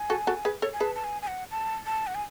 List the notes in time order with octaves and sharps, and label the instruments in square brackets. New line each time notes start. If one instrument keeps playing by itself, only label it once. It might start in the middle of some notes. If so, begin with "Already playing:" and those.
Already playing: [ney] G#5
[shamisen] F#4 A4
F#4 A4
G#4 B4
A4 C#5
[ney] G#5
[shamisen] G#4 B4 [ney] A5
[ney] A5
G#5
G#5
F#5
A5
A5
F#5
G#5